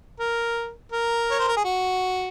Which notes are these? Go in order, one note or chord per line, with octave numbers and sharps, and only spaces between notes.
A#4
A#4
C#5
C5
A#4
G#4
F#4